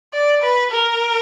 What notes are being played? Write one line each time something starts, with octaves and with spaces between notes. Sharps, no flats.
D5
B4
A#4